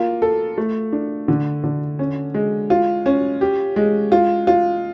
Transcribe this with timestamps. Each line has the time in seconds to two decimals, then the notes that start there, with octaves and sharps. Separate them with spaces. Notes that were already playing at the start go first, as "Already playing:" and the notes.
Already playing: A#3 F4
0.22 A4
0.58 A3
0.92 D4
1.28 D3
1.64 D3
1.99 C#4
2.34 G#3
2.70 F4
3.06 C#4
3.41 G4
3.76 G#3
4.12 F4
4.47 F4